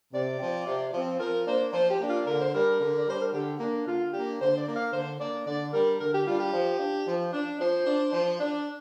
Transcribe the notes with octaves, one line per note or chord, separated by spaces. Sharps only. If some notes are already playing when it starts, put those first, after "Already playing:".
C3 D5
F3 C4
C3
F3 C4
F3 A#4
A#3 D4 C5
F3 C5
G4
A#3 D4
F4
D3 A#4
C5
G3 D4 A#4
D3
D5
G3 D4 C5
A#4
D3 G4
A#3 D4
D3 F4
A#3 D4 G4
D3 C5
D5
A#3 D4
F5
D3 C5
A#3 D4 D5
D3 D5
G3 D4 A#4
D3 A#4
G4
G3 D4 F4
G4
F3
D4
F3
D4
F3 C5
D4
F3
D4